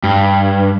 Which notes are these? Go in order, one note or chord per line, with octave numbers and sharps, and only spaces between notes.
G2